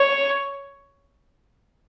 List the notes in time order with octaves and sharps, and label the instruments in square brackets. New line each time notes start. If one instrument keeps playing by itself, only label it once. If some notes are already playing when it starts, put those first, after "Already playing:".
Already playing: [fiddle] C#5